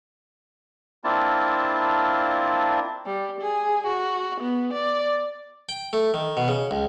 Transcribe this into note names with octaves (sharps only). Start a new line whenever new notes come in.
A#3 C4 D4 E4 F4 A5
G3
G#4
F#4
B3
D5
G5
A3
D#3
B2
C#3
C#2